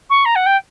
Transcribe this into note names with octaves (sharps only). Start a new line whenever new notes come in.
C#6
A#5
F#5
G5